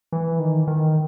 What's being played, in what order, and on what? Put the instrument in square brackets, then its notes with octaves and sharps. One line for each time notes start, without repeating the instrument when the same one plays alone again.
[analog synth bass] E3
D#3
D#3